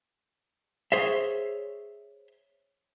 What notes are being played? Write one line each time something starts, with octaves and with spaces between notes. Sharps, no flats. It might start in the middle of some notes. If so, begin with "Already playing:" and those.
G#4 C5 C#5 E5